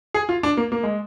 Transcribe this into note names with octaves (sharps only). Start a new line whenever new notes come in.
G#4
F4
D4
A#3
A#3
G#3